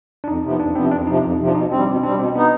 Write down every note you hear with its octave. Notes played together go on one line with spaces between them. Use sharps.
D4
F2 D#4
C3 F3 B3
F2 D4
C3 F3 B3 C4
F2 D4
C3 F3 D#4
F2
C3 F3
D4
B2 D#4
G3 C4 D4
B2 C4
G3 C4 D4
B2 C4
B3 D4 D#4